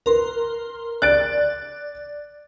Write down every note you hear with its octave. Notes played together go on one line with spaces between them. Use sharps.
A#4 B4 C6
D5 F#6 A6 D7